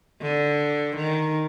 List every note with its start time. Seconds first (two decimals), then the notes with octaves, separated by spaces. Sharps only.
0.22 D3
0.97 D#3